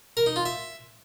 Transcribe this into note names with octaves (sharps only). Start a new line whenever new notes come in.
A#4
D#4
F4
E5